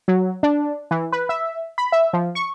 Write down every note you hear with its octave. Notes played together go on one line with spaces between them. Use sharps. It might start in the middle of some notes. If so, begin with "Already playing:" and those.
F#3
D4
E3
B4
E5
B5
E5
F3
C#6